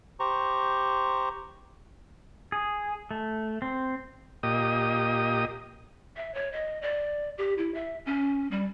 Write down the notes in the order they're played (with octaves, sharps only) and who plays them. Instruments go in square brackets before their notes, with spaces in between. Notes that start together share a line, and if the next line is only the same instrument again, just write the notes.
[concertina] G4 C5 A#5 C#6
[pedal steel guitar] G#4
A3
C4
[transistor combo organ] A#2 G4 D#5 D#6
[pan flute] E5
C#5
D#5
D5
G4
E4
E5
C#4
G3